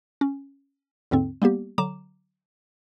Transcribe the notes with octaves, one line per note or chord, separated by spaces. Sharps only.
C#4
D#2 G#2 D3 C4
G3 A#3 B3 G4
D3 F#3 A#5 D6 E7